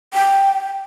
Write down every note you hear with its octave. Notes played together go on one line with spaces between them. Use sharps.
G5